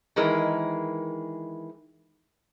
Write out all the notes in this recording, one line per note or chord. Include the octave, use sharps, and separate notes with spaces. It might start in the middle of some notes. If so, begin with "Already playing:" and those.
D#3 E3 G#3 A#4